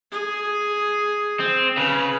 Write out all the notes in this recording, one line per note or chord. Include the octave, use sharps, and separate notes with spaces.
G#4
C4
C#3 B4